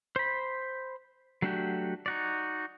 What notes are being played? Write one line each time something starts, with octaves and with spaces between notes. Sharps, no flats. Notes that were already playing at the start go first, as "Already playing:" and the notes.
C5 B5
F#3 A3 D4 F#4 G4
D#4 F#4 D5